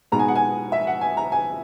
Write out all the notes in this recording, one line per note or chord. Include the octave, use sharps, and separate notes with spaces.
B2 G#3 B3 D#4 A#5
G#5
F#5
G#5
E5
F#5
G#5
A#5
G#5